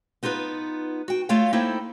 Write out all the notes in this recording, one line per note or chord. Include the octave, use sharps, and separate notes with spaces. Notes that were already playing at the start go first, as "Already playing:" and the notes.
B3 D#4 F4 G4 B4
F#4 G5
A3 F4 C#5 F5 G5
A#3 D#4 E4 A4 C5 G5